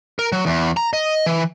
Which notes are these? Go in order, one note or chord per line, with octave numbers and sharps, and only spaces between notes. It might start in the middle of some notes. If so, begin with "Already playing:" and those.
A#4
F#3
E2
A#5
D#5
E3